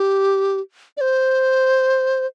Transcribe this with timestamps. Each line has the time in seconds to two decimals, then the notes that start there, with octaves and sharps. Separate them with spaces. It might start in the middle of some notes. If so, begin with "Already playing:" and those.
Already playing: G4
0.97 D5
1.01 C5